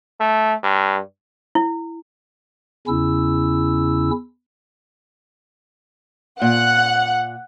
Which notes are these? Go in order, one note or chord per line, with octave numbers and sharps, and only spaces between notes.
A3
G2
E4
E2 C#3 C#4 E4 E6
A#2 F#5